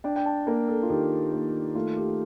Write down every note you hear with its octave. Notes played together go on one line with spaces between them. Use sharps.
D4 G5
G5
A5
A#3 A#4
A4
F4
D#3 G4
A#3
A3 F4
G4